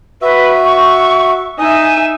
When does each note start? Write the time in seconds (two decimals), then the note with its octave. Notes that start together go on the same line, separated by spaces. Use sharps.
0.22 F#4 B4 E5
0.65 C#6
1.58 D#4 D#5 E5 G#5